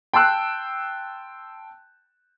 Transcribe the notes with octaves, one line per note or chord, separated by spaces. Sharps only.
G5 A5 C6 E6 F#6